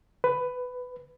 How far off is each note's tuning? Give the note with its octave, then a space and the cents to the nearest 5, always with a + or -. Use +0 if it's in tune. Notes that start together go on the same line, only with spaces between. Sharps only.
B4 +15